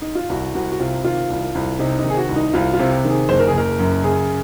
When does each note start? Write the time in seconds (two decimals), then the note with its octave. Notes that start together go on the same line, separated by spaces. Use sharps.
0.02 D#4
0.15 F4
0.29 C2 F#4
0.55 C2 F#4
0.72 F#4
0.79 C3 F4
1.04 D#3 F4
1.30 C2
1.55 C2
1.79 C3 D#4
1.99 D#4
2.04 D#3
2.10 G#4
2.17 F#4
2.29 C2
2.36 D#4
2.54 C2 F4
2.73 F4
2.80 C3
3.05 D#3
3.10 G#4
3.29 F#1 C5
3.39 A#4
3.48 G#4
3.53 F#1 A#4
3.79 F#2
4.04 C#3 G#4